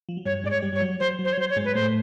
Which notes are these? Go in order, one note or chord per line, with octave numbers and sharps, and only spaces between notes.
F3
F#3
G2 G3 C#5
G#2 G#3 D5
C#5
G2 G3
G3 C#5
F#3
F#3 C5
F#3
C5
C#5
F#3 C5
C#5
G#2 G#3
B4
A2 A3 C5